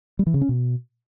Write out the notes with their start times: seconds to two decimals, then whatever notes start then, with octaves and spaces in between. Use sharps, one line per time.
0.19 G3
0.27 E3
0.34 C#3
0.41 C#4
0.49 B2